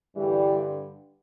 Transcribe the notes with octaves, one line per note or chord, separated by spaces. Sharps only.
G2 D3 E3 G3